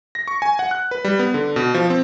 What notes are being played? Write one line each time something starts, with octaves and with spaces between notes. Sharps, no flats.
A#6
C#6
G#5
F#5
F#6
B4
G3
B3
D3
B2
F3
C4